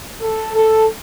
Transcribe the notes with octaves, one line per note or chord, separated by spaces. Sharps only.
A4
A4